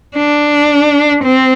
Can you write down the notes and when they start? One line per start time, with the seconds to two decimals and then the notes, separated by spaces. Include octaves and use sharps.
0.16 D4
1.23 C4